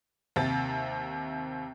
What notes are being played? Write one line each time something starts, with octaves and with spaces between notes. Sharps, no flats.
D#2 C3 A6